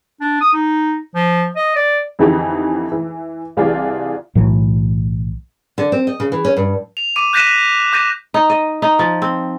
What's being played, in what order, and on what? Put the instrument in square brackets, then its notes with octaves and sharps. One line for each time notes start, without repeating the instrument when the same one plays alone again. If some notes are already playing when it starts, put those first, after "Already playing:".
[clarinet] D4
D#6
D#4
F3
D#5
D5
[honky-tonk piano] F2 D3 E3 D#4 G4
E3
C2 E3 F4 G4 G#4 D5
[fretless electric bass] B1 A2 E3 F#3
[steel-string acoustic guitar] D3
C4
D#5
C#3
E3
C#4
G2
[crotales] F7
D6 D#7
F#6 G6 A#6 B6 D#7 E7
D6 G6 A#6 D#7
[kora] D#4
D#5
D#4
F3
C4